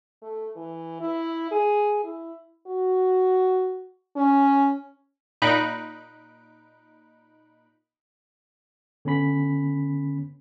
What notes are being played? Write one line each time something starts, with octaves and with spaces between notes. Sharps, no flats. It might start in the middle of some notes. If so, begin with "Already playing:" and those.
A3
E3
E4
G#4
E4
F#4
C#4
A#2 D#4 B5 F#6 D7
D3 B3 C#4 B5 B6